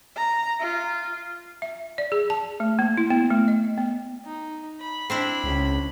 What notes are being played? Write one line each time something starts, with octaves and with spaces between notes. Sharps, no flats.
A#5
F4
E5
D5
G#4
A5
A3
A#3
E4
B3
A3
D#5
B3
D#4
B5
C4 D4 E4
C#2